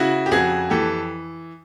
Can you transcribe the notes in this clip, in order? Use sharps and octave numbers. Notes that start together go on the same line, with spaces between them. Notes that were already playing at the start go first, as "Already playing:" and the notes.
Already playing: C#3 E4 F#4
G4
F2 F#4 G#4
E3 G4 A4